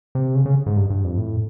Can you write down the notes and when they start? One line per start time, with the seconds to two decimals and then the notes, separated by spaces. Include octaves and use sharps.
0.15 C3
0.35 C#3
0.46 C#3
0.66 G#2
0.77 G2
0.90 G2
1.04 F2
1.18 A2